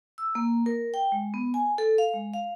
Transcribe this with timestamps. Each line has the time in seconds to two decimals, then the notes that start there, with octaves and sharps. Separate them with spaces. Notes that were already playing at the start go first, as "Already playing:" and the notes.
0.18 E6
0.35 A#3
0.66 A#4
0.94 G5
1.12 G#3
1.34 B3
1.54 G#5
1.78 A4
1.98 F5
2.14 G#3
2.34 F5